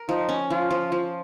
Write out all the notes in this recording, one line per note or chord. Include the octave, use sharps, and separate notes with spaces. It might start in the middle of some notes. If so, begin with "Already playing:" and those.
Already playing: A#4
F3 D#4
C#4
F3 F4
F3
F3